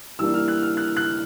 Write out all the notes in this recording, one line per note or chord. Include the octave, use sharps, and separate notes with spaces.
E3 G3 A#3 D4 E6
F6
F#6
F6
F#6
F#6